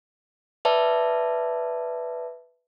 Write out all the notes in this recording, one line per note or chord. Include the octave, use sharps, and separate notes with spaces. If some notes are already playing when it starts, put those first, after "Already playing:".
B4 D5 E5 A5